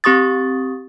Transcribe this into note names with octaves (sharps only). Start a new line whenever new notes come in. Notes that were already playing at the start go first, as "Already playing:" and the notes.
C4 G4 C#6 D#6 A6